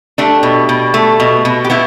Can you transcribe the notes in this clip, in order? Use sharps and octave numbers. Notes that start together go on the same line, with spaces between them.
A3 D4 G4
B2
B2
A3
B2
B2
G4
B2 B3 E4